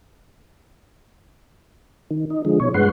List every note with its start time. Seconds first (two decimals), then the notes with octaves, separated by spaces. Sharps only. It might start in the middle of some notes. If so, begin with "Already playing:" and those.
2.10 D#3
2.30 D#4
2.45 D3 F3 G#3
2.60 B2 C#5
2.74 G2 G#3 B4 F#5 C6